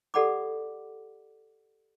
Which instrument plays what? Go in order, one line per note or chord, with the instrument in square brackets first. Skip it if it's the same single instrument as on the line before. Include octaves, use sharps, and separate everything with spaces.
[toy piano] G4 A4 D5 F#5 B5 D6